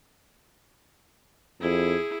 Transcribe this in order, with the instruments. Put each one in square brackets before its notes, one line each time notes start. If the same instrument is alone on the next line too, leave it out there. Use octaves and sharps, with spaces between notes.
[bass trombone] F2 [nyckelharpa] E4 G#4